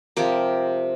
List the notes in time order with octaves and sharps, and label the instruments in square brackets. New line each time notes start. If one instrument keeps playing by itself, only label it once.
[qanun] C3 F3 G#3 G4 A#4